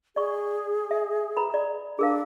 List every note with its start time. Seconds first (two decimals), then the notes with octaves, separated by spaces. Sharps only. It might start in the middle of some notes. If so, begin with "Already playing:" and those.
0.16 G#4 D5 C#6
0.91 E5
1.37 B4 A#5 B5
1.54 D5
1.99 D4 G#4 A#4 F5